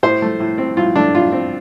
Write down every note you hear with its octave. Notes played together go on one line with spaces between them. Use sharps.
A2 C5
A3
A2
C4
A2 F4
A3 D4
A2 F4
C4